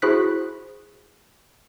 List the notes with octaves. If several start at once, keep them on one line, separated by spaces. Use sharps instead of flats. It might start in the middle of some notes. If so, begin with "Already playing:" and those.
E4 F#4 G#4 C5 F#6 B6